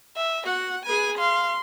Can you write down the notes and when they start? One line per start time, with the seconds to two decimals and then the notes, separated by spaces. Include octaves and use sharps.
0.16 E5
0.46 F#4 F#5
0.86 G#4 B4 G#5
1.18 F5 C6